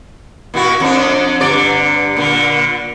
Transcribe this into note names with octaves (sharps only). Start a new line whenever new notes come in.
A#2 E4 F#4
F2 D4
G2 D3 D5
A#2 D3